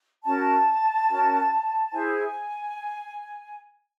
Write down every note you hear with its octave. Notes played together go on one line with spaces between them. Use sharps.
C#4 F#4 A#4 A5
C#4 F#4 A#4
E4 G#4 C5 G#5